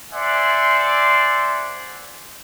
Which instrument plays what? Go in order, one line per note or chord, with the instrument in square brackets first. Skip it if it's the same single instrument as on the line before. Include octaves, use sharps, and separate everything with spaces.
[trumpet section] C5 D5 E5 F#5 G#5 C6